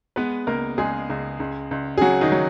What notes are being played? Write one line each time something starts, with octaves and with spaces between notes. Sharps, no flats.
G#3 B3 B4
C#2 A#3 A#4
C#2 G#3 G#4
C#2
C#2
C#2
G#4
C#3 F#3 F#4
D#3 D#4
F#3